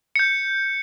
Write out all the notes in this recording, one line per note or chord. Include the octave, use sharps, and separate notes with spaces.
G6 C#7